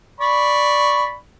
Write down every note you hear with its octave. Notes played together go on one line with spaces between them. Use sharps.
D5 B5 C#6